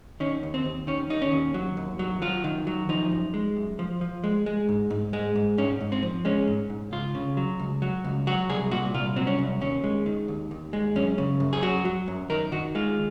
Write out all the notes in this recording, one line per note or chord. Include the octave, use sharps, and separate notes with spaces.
D#3 C#4
D#2
C4
D#2
D#3 C#4
D#2 D#4
C#4
D#2
F#3
D#2
F#3
F#3 F4
D#3
F#3
F3 D#4
F#2
G#3
F#2
F3
F3
G#3
G#3
G#2
G#2
G#3
G#2
G#2 C#4
G#2
C4
F3
G#3 C#4
G#2
G#2
C#2 F4
C#3
F#3
C#2
F#3
C#2
F#3 F#4
C2 G#4
A#2 F#4
C2 F4
F#3 C4
C#4
C2
D#2 C#4
G#3
D#3
D#2
D#2
G#3
F#2 C#4
C#3
F#2
G#4
F#3 F#4
F#3
F#2
D#3 A#4
D#3 F#4
G#3 F4